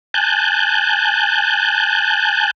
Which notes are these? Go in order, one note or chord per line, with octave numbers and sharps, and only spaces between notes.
G#5 A5 F#6 G6